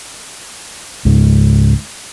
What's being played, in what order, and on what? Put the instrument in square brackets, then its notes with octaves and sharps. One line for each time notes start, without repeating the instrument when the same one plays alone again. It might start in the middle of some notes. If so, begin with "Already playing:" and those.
[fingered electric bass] C#2 G#2